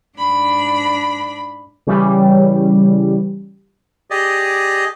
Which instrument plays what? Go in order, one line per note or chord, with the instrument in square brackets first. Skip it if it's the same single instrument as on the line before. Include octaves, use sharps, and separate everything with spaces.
[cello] G#2 D4 [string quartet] B5
[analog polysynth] C#3 E3 G3
[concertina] G4 G#4 D5 D#5